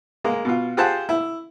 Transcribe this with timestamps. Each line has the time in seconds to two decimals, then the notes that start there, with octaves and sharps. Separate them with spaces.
0.24 G#3 A#3
0.45 B2 F4
0.77 F4 G4 G#4 C5 F#5 A5
1.09 E4